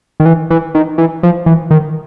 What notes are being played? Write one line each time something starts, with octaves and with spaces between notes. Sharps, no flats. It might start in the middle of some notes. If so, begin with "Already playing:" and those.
D#3
E3
E3
D#3
E3
F3
E3
D#3